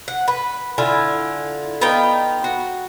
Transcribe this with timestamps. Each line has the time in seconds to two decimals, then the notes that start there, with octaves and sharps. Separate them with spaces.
0.08 F#5
0.28 B4
0.78 D3 E4 F4 G#5
1.81 B3 D#4 F4 G5
2.44 F#4